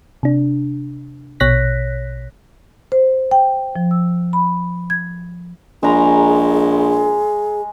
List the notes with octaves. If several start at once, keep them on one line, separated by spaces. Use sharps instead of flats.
C3 D4
A#1 B2 C#5 F#6 A#6 B6
C5
G5
F3
E6
B5
G#6
A#1 G#3 G#4 A#5